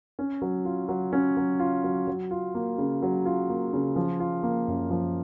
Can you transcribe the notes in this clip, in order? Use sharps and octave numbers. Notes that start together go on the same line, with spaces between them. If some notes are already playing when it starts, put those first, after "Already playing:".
C#4
F#3
F4
F#3
C#4
F#3
F4
F#3
F#3
F4
A#3
C#3
F#3
F4
A#3
C#3
F3
F4
A#3
F#2
F3